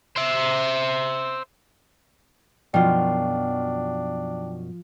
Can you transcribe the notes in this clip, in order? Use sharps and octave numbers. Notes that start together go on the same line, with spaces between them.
C5 E5
F#2 B2 F3 D4 F4 G5